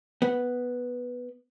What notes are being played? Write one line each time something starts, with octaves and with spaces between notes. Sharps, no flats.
B3